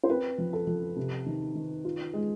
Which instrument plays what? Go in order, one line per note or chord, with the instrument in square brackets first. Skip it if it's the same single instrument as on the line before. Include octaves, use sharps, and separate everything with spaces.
[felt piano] C5
[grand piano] C4 [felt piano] B4
[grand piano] F3
[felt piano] A4
[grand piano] F3
C3
D#3
D#3
F4
G#3